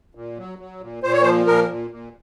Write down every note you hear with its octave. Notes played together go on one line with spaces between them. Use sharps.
A#2
F#3
F#3
A#2
A#2 C5
C#5
F3 C5
A#2 A#4
A#2
A#2